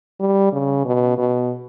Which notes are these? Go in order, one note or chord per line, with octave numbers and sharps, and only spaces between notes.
G3
C#3
B2
B2